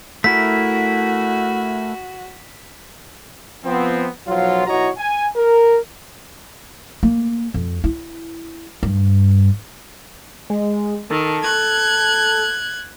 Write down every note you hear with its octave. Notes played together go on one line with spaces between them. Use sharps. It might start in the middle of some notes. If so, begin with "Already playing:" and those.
A3 E4 F#4 A#4 B6
F3 B3 C4
B1 F3 F#3 F4
B1 E4 F#4 C#5 D#5 A#5
G#5
A#4
A#3
F2
E4
G2
G#3
D#3 A4
F#6 G#6